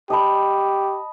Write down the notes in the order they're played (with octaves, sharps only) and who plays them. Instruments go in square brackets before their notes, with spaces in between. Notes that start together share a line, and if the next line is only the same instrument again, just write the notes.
[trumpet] G4 [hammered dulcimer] D#5 A5 B5